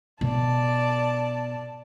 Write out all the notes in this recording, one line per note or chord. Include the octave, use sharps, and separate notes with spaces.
B2 D5 A5